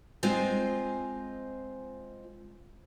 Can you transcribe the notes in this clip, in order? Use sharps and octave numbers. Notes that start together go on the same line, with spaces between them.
G#3 C4 F4 C5 D#5 G#5